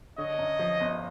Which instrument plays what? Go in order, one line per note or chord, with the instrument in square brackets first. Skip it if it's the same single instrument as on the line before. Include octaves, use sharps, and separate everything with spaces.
[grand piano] D3 [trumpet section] C#5 D#5
[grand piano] F#2
F3
G1